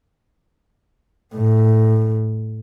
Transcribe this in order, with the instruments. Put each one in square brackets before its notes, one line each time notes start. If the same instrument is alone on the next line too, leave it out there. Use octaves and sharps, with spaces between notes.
[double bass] A2